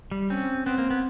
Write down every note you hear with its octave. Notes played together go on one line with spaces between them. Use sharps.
G3
C4 C#4
B3 C4
A#3
B3